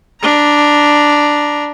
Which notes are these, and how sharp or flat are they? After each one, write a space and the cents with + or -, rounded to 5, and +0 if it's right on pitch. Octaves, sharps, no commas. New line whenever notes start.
D4 +0 A#5 +20